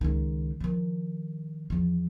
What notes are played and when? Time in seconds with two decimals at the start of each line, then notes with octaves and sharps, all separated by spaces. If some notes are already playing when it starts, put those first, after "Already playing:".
0.01 C#2 D#3
0.60 D#3 F3
1.70 E2 F3